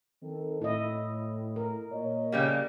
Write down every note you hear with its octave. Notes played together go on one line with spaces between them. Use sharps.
D#3 C4 A4
A2 E4 D#5
A#4
A#2 C#5 D#5
C#3 G3 A#3